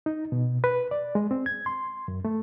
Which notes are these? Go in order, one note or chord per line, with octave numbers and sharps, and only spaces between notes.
D#4
B2
B4
D5
G#3
C4
G#6
C6
F#2
A3